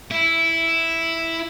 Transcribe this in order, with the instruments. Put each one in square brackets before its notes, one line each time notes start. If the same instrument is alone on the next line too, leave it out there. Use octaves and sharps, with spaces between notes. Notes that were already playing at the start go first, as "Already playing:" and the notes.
[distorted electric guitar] E4